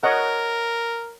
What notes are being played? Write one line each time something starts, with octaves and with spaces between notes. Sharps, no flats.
A#4 C#5 D#5 F#5